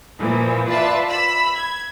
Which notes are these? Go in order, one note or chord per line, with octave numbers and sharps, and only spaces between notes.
A#2 E3 F3
F4 B4 D5 E5 A5
B5 E6
G#6